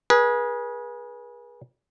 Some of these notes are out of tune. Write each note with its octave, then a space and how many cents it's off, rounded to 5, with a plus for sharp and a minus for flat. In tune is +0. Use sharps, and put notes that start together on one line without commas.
G#4 +0 B4 -40